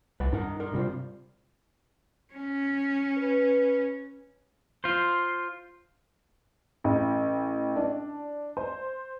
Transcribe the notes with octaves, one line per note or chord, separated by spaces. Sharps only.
C2 B4 D5 F#5
G2 D#4 A#4 F#5
D4 A#4
C3 G3 F4 C5
C#4
B4
F4 C5
A1
D4
C5